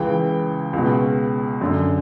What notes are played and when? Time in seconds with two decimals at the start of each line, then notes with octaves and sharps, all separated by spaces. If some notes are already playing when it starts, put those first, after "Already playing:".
Already playing: C#2 C#3 E3 G5
0.73 C#2 B2
1.61 F#2 D3